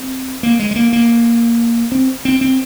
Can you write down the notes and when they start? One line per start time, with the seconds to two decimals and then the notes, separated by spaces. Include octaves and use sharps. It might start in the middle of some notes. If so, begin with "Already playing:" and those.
Already playing: C4
0.43 A#3
0.59 G#3
0.71 G#3
0.76 A#3
0.93 A#3
1.92 C4
2.25 C4
2.41 C4